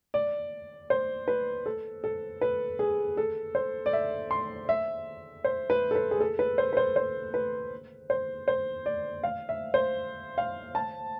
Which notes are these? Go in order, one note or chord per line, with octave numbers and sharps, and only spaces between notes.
D5
C5
B4
A4
A4
B4
G#4
A4
C5
D5
E5
C6
E5
C5
B4
A4
B4
G#4
A4
B4
C5
B4
C5
C5
B4
C5
C5
D5
F5
E5
C5
F5
A5